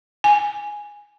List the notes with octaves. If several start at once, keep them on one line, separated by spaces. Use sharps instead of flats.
G#5